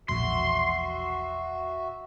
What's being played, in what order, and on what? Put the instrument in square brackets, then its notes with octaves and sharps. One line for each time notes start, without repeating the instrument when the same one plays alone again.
[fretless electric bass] E1 A#1 [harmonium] F#4 E5 [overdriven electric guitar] C6